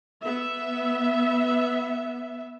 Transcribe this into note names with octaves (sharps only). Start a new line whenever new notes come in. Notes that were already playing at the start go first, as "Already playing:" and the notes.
B3 E5